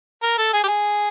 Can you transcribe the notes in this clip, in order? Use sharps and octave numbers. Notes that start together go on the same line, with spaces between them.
A#4
A4
G#4
G4
G#4